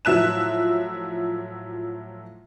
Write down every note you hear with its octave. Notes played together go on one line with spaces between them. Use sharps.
A2 F3 F#3 E5 F#6 E7